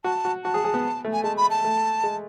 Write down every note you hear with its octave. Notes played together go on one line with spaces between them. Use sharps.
F#4 A5
F#4
F#4 A5
G#4
G#4
B3
A3
G#5
G#3 A5
B5
A5
A3
G#3